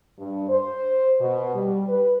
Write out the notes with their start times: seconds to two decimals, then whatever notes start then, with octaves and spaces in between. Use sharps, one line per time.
0.18 G2
0.49 C5
1.21 B2
1.55 G3
1.89 B4